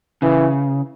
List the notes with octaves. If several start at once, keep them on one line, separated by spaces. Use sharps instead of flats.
C#3 E3